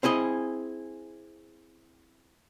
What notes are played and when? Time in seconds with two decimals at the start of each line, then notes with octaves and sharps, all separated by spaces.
0.03 C4 E4 G#4 D#5